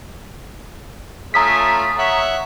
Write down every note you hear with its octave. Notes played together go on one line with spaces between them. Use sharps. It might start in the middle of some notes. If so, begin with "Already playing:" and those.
A3 C#4 F4 A#5 D#6 B6
C#5 E5 F#5